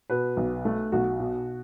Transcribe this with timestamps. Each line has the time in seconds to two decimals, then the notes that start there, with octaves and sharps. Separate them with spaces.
0.10 B2 B4
0.37 B1
0.65 A3
0.92 B1 F#4
1.20 B2